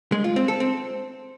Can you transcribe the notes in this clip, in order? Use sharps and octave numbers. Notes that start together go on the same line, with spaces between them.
G#3
F4
C4
A4
C4